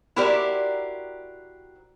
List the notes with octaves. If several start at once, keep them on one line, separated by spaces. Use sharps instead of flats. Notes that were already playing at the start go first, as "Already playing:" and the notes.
E4 F#4 G4 A#4 C5 D5